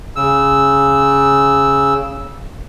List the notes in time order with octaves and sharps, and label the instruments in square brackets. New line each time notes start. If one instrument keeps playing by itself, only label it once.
[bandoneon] C#3 E6